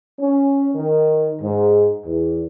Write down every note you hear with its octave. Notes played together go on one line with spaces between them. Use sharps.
C#4
D#3
G#2
E2